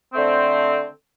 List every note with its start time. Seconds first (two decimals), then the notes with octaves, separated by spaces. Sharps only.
0.13 D3 A3 C4